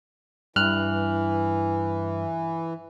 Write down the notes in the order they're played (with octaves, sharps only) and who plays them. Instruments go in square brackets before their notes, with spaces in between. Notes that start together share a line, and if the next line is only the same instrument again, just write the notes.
[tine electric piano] G2 F6 F#6 [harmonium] E3